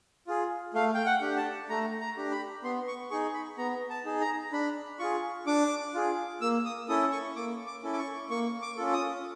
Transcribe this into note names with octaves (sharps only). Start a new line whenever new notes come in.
F4 G#4
A3 F5
G5
F#5
D4 G4
A5
A3 A#5
A#5
D4 G4
B5
B3 C6
C#6
D#4 G#4 C#6
B5
B3 A#5
A5
D#4 G#4
A#5
D4 B5
F4 G#4 C#6
D4 D6
F4 G#4
A#3 E6
D#6
C#4 E4 A4 D#6
C#6
A#3 D6
D6
C#4 E4 A4
D6
C#6
A#3 C#6
D6
C#4 F4 A4
D#6